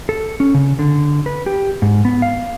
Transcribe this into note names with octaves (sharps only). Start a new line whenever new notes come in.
A4
C#4
C#3
D3
B4
G4
G#2
B3
F5